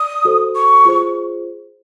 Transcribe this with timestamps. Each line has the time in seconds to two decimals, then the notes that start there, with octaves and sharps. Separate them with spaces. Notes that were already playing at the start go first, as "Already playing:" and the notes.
Already playing: D5 D#6
0.25 F#4 A4 C5
0.55 C#6
0.85 F4 G#4 C5